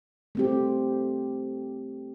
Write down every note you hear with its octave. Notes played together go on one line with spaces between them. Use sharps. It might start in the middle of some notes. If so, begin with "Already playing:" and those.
A3 C4 G4